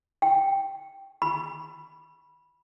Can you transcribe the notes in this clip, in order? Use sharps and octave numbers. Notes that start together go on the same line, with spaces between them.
G5
B5